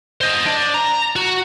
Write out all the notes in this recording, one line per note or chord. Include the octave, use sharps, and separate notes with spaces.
C5 D#5
D4
A#5
F#4